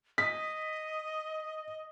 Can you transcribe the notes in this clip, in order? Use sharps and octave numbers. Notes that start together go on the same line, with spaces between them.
D#5 D#6 B6